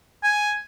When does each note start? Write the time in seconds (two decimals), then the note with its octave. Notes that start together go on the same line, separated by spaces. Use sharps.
0.23 G#5